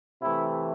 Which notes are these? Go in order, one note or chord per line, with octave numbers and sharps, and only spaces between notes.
C3 E3 A3 E4